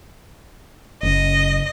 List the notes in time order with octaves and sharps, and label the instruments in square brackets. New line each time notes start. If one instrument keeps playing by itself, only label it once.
[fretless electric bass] F#1 [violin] D#5